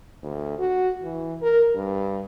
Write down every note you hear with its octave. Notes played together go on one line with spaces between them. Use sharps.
D2
F#4
E3
A#4
G2